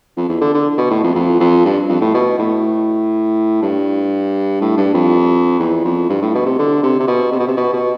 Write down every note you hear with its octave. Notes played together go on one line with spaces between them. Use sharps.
F2
E2
D3
D3
B2
A2
F2
F2
F2
G2
F2
A2
B2
A2
G2
A2
G2
F2
E2
F2
G2
A2
B2
C3
D3
C3
C3
B2
C3
B2
C3
B2
B2